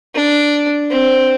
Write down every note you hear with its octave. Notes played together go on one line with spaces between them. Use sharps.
D4
C4